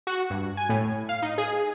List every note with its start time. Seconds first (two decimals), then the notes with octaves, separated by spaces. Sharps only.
0.07 F#4
0.30 G2
0.57 G#5
0.69 A2
1.09 F5
1.22 D#4
1.38 G#4